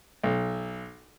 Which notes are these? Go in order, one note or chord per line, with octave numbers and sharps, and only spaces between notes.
B1